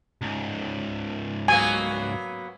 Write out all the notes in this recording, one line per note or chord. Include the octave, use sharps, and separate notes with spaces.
C#2 G#2
F#3 A#3 B3 G#5